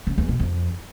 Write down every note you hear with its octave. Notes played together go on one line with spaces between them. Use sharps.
C#3
E2
B2
F2